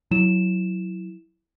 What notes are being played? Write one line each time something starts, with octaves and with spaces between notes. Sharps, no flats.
F#3 E4 E7